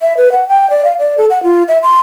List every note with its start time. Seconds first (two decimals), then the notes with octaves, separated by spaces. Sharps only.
0.02 E5
0.17 B4
0.32 F#5
0.48 G5
0.70 D5
0.85 F5
0.99 D5
1.18 A4
1.30 F#5
1.43 F4
1.68 E5
1.83 C6